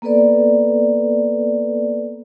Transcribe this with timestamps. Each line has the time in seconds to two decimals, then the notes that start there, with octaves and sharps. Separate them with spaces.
0.02 A#3 B3 A4 B4 D5